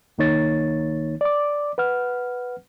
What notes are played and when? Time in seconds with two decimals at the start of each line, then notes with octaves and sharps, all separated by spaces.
0.18 C2 D#3 A#3 D#4 C#5 A6
1.21 D5 D6
1.78 B4 F#5 F6